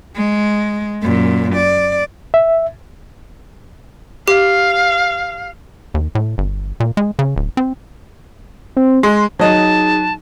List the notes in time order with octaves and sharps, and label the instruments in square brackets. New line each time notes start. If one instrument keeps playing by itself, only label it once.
[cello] G#3
F#2 A#2
D5
[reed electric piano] E5
[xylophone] G4 [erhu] F5
[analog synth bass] D#2
A2
G1
A#2
G#3
C#3
D1
C4
[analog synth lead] C4
[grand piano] G#3 [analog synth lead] C6
[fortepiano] F#3 D#5 [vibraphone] D#4 G#4 [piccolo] A5